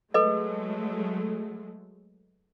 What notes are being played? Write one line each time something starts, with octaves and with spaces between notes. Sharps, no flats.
F#3 G#3 A3 A4 B4 D#5